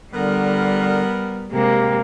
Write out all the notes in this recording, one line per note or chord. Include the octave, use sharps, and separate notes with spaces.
D3 G3 B3 A#4
C3 G#3 A#3 G4